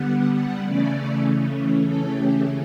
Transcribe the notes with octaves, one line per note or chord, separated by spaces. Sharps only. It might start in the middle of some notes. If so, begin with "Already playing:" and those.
Already playing: D3 G3 B3 F#5
F#5
C#3 E3 A3 C#4 D5
C#3 E3 A3 C#4 A4
G4